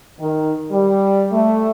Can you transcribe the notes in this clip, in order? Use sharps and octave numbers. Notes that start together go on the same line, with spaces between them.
D#3
G3
A3